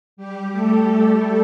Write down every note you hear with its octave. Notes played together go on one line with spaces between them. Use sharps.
G3 G4
A3 A4
G3 G4